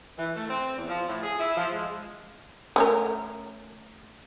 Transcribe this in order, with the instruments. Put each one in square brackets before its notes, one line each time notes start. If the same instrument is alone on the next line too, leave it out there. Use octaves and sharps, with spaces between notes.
[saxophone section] E3
A3
C4
E2
F3
A2
G#4
E4
F3
G#3
[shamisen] A3 C#4 A#4